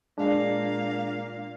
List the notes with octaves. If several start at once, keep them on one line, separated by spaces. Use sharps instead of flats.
A#2 G#3 D4 F5